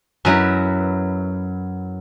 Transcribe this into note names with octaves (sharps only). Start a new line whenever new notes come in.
F#2 F#3 E4 B4